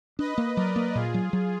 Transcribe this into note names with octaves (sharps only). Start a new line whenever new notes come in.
D4 B4 D#5
A#3
F#3 A#4 D5
A#3
A#2 F4 G#4
F#3
F#3